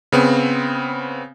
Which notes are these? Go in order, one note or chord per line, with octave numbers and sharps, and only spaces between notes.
C#3 B3 C4